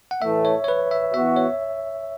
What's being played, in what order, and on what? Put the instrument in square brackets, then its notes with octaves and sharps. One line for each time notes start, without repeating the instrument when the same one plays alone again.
[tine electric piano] F#5
[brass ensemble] A2 E3 A3 [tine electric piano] E5
[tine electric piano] C#5
C#5
B4
E5
[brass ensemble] E3 B3 F#4 [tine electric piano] E5
[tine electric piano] C#5